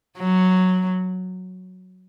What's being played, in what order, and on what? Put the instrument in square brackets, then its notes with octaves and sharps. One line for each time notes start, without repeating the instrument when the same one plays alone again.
[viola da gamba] F#3